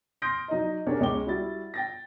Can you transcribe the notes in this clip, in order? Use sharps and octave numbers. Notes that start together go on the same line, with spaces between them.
C6 D#6 F6 G6 A#6 D7
F#3 D#4 D5 D#5
C#4 D4 G4 G#4 A#4 C#5
C#2 G#3 C#4 G5 D6 G7
G3 E4 F#4 A6
G5 A6 A#6